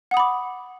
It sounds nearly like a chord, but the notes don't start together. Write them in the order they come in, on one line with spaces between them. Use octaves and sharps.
F#5 D#6 B5 D6